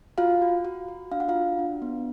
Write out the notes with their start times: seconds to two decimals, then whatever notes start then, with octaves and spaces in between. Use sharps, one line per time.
0.18 F4 F#4 F5
0.42 F#4
0.65 F#4
0.88 F#4
1.11 D4 F5
1.20 F#5
1.28 F4 F5
1.35 D4
1.59 D4
1.82 B3